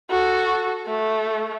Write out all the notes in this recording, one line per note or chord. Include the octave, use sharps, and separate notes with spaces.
F#4 A4
A3